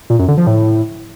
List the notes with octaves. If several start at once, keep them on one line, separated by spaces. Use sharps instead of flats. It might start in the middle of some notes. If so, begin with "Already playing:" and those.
A#2
F#2
D3
F3
A2